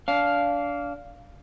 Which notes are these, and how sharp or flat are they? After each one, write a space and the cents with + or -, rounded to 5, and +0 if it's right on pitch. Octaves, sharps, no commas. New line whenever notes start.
D4 -25 F5 +0